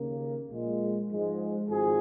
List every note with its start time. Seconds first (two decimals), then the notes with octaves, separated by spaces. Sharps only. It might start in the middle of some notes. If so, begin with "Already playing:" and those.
Already playing: D#2 C#3 A#3
0.49 A#1 A#2 G#3
1.09 G#2 F3 G#3
1.69 G#1 G#2 F3 G#4